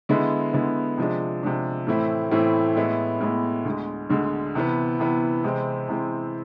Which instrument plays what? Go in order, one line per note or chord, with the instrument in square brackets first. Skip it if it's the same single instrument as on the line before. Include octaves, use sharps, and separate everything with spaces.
[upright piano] D3 G#3 B3 E4
D3 G#3 B3 E4
C3 F3 G#3 D4
C3 F3 G#3 D4
A2 E3 A3 C4 E4
A2 E3 A3 C4 E4
A2 G#3 B3 E4
A2 G#3 B3 E4
D2 D3 G#3
D2 D3 G#3
C3 E3 B3
C3 E3 B3
C3 E3 G#3 C4
C3 E3 G#3 C4